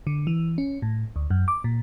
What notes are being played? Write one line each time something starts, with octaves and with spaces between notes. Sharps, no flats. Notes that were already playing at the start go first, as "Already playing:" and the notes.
D3
E3
C#4
A2
D2
F#2
D6
A#2